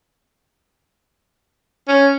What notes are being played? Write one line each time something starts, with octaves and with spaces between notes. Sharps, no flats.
C#4